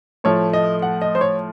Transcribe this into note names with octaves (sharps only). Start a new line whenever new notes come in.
A2 F3 A3 C#5
D#5
F#5
D#5
C5
C#5